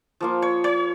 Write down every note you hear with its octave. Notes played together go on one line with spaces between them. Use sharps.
F3 A#3 F4
C#5
C#5